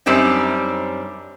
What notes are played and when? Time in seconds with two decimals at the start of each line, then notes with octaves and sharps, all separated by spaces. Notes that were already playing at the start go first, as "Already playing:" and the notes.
0.06 F#2 G3 C4 D4 D#4